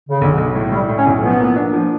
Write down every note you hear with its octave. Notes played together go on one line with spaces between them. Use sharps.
C#3
B1 D3
B1
A2
A2 G3
A2
C#4
B1
F3 B3
A#3
D4
F3